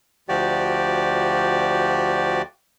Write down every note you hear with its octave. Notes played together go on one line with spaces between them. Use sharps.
D2 F3 F#4 G4 D5